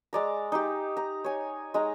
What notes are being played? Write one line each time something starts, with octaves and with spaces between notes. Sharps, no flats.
G#3 D5 A#5
D#4 G4
A#5
C#5 G#5
G#3 D#4 A#5